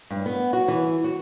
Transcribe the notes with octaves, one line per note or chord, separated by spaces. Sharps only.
G2
B3
F#4
E3
F#4